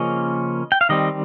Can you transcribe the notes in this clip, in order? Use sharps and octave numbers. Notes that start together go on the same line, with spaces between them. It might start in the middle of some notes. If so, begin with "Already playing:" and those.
Already playing: C#3 F3 A#3 C#4 D#5
G5
F5
D#3 G3 C4 D#5